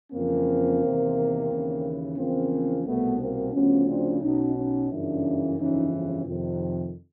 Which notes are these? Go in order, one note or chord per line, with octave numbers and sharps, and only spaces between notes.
F2 C#3 E3 A#3 C4
E2 C3 D#3
D#2 C#3 E3
E2 C#3 F3 A#3 C4
C2 B2 A3 B3
A#3 C4
D2 C#3 F3 B3 C#4
C4 D4
B1 B2 C#4 D#4
C#4 D#4
G1 F#2 C#3 E3 D4 E4
G1 F2 C#3 E3 C#4 D#4
F2 C3 D#3